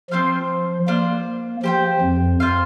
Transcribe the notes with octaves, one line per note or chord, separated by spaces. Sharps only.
F3 C4 F4 C5 F5
A#3 D4 F4 C5 F5
F3 G4 C5 G5
F2
F4 C5 F5